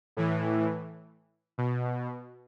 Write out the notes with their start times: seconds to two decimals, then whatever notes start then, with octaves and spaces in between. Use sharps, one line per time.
0.17 A2 E3
1.58 B2